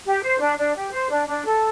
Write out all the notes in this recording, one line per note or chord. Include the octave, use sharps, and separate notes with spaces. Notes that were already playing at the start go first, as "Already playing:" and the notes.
G4
C5
D4
D4
G4
C5
D4
D4
A4